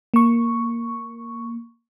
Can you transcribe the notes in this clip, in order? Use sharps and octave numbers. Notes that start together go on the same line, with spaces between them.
A#3 C#6